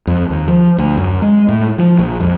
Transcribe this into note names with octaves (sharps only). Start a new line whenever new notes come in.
F2
D#2
F3
D2
F#2
G#3
A2
F3
A#1
F2